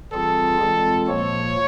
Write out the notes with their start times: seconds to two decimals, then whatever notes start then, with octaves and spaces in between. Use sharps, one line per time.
0.12 E3 G3 C4 F4 G#4 A4
0.61 E3 G#3 C4 F4
1.09 A#2 F3 A#3 C#5